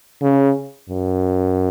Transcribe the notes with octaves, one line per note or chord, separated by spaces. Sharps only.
C#3
F#2